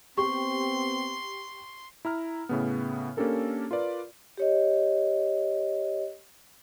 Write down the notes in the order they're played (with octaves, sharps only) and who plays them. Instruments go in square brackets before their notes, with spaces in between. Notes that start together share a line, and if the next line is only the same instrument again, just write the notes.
[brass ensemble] B3 C4 [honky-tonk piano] G4 [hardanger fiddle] C6 [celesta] C#6
[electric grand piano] E4 A#5 F6
A2 C#3 B3
A#3 C#4 D4 G4 A4 A#4
F4 A#4 B4 D5
[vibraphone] G4 C#5 D#5